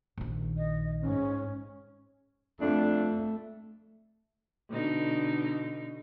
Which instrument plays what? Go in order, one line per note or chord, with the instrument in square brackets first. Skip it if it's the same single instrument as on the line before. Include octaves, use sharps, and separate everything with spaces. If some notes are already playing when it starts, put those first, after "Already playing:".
[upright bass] A#1 D#3
[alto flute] D#5
[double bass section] G#2 [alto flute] C#4
[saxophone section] F2 D4 [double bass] A3
[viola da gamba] B2 D3 D#4